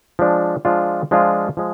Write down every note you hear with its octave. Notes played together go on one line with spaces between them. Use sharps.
F3 G#3 D4
F3 G#3 D4 F4
F3 G#3 D4 F4
F3 G#3